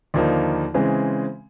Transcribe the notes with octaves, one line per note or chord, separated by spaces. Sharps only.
D#2 D3 F3 A#3 D#4
C#3 E3 G#3 C4